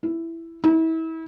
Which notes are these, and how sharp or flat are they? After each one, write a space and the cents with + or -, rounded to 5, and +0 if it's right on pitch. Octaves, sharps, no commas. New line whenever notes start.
E4 +5
E4 -35